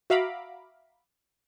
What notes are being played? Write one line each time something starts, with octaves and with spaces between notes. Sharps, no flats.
F#4 E5 F5 A#5 B5 D6